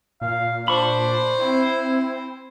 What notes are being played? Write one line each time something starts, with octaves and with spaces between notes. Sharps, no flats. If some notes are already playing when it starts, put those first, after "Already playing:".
A#2 F5
D4 C5 B5 C#6
C4 E4